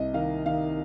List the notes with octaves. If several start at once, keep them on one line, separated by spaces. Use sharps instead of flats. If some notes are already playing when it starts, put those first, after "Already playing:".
Already playing: C2 D#5
D#3 F5
D#3 F5